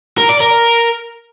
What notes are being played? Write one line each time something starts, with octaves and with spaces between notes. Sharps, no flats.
A#4
D5
A#4